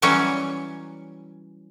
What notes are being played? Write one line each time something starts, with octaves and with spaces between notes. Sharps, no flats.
E3 F#3 G3 C#4 C#5